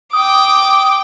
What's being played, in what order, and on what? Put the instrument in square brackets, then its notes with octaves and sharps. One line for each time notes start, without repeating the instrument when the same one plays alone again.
[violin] G5 D6 [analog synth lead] D#6